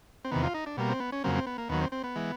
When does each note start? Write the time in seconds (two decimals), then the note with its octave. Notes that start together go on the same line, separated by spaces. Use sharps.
0.25 C4
0.31 E2 C3 D#3 B3
0.43 F4
0.54 D#4
0.66 D4
0.77 B2 G3 A#3
0.89 C4
1.00 B3
1.12 C#4
1.24 F2 C#3 F#3 A#3 C4
1.35 C4
1.47 B3
1.58 A#3
1.69 D#2 D#3 F#3 B3
1.81 C4
1.92 C4
2.04 B3
2.16 E3 G#3